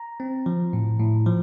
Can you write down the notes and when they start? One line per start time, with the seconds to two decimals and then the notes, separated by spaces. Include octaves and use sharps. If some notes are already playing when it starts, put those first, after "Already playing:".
Already playing: A#5
0.20 C4
0.46 F3
0.73 A2
1.00 A2
1.26 F3